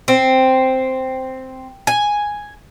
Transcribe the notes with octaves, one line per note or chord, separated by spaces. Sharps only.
C4
G#5